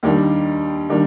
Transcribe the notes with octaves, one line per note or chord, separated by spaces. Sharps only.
D#2 D#3 G3 A#3 D4
D#3 G3 A#3 D4